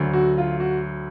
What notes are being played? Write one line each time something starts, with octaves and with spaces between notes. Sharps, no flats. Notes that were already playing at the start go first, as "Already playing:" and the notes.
Already playing: D2 D3 F#3
F#4
F4
F#4